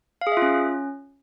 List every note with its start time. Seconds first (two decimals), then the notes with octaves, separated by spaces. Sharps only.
0.21 F5
0.27 G#4
0.32 E5
0.37 F4
0.42 C#4